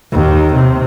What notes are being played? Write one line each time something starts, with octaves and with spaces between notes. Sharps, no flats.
D#2
C3